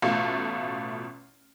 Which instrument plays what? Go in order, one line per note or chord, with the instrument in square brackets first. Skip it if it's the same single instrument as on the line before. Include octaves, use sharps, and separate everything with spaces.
[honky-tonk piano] A1 B2 A3 F4